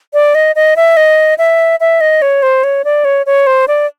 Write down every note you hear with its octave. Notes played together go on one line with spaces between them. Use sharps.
D5
D#5
D#5
E5
D#5
E5
E5
D#5
C#5
C5
C#5
D5
C#5
C#5
C5
D5